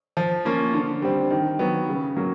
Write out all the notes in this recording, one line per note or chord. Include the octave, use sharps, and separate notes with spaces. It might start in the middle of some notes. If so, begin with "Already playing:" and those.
F3
A#3 C#4 F4
D3
G3 C4
D#3
F#3 B3
C#3
F#3 A#3